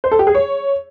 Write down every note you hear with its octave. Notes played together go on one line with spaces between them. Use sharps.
C5
A4
G4
G#4
C#5